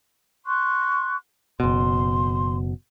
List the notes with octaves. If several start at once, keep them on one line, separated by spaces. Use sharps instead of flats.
C6 C#6 F#6
F#1 B2 C6